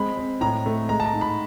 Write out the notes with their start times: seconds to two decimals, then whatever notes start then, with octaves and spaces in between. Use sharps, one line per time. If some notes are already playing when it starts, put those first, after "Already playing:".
Already playing: G#3 C4 B5
0.17 C4
0.41 A2 A#5
0.66 A3
0.89 G#3 A#5
1.00 A5
1.06 A#5
1.13 G#2
1.21 B5